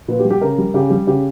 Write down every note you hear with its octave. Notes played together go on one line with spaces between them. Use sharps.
A#2 B4
G4
G3
G4
C#3 A#4
G3
C#3 G4
G3 G4
C#3 G4